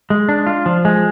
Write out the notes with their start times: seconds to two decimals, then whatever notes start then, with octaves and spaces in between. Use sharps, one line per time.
0.10 G#3
0.29 D4
0.46 F4
0.66 F3
0.85 G#3